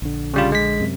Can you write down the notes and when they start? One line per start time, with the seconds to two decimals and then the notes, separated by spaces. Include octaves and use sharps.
0.02 A#1 D3
0.34 C#3 G3 F4
0.52 G#3 B6
0.80 F#2 C3